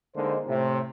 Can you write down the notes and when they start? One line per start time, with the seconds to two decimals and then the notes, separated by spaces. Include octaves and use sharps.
0.16 D3 G#3 A#3 D#4 C5
0.48 A2 C3